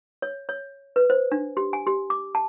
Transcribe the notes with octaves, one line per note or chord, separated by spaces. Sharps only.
C#5
C#5
B4
C5
D4
G4
G#5
G4
D6
A5